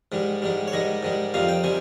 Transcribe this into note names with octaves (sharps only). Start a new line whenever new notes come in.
G#2 D#3 G3
G#2 D#3 G3
C#5
G#2 D#3 G3 D#5
G#2 D#3 G3
F2 C3 D#3 G3 F5
G5
C3 D#3 G3 G#5